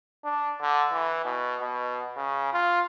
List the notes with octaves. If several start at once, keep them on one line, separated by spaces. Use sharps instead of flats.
D4
D3
E3
B2
B2
C#3
F4